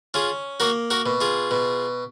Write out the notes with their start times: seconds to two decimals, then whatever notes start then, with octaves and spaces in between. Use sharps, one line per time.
0.14 C#4 F4 G#4
0.60 A#3 F#4 A#4
0.90 F#4 A#4
1.06 B2
1.21 F4 G#4
1.51 B2